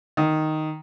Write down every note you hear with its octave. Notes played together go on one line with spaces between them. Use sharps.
D#3